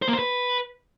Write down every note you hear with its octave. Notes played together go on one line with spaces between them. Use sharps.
C5
A#3
C5
B4